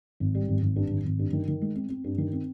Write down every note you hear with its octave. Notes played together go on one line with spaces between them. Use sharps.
G#1
G3
G#1
G#1
G2
G#1
G#1
G2
D#3
D#3
G#3
C4
C4
G2
D#3
C4